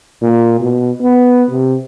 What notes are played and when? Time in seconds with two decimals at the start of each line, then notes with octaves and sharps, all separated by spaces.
0.21 A#2
0.60 B2
1.01 B3
1.50 C3